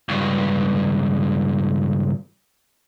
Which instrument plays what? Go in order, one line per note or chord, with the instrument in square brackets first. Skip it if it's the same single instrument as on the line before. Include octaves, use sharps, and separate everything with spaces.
[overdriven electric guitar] C#2 G2